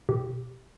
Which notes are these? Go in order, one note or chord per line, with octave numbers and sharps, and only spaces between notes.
B2 G4